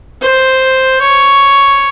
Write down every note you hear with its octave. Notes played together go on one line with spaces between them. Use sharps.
C5
C#5